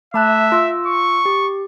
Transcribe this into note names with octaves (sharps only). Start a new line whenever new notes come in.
A3 E5 A5 F#6
F4 E6
C#6
G4